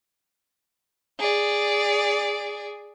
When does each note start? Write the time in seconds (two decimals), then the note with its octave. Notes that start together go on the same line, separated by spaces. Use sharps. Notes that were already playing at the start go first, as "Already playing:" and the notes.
1.20 G#4 D5